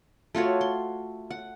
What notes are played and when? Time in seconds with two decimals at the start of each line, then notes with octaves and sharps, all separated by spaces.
0.35 A3 F4 F#4 C#5
0.61 C6
1.31 F#5